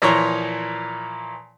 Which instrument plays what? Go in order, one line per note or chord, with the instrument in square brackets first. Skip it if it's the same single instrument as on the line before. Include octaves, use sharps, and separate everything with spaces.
[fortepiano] A#2 E3 F3 C#5 A#5 C6